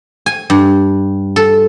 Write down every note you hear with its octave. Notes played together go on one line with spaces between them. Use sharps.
G#5
G2
A4